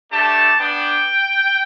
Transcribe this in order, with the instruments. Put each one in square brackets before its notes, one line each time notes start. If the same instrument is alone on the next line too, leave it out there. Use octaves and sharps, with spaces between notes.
[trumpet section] A3 D4 G4 A5
B3 D4 G5